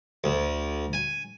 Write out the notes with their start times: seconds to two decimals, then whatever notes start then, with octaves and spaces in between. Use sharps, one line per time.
0.24 D2
0.93 G#5